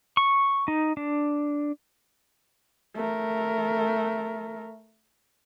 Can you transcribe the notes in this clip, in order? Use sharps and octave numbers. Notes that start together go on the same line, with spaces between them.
C#6
D#4
D4
A3 A#4